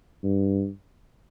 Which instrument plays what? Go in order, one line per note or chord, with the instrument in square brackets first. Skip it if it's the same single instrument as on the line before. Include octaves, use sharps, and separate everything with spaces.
[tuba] G2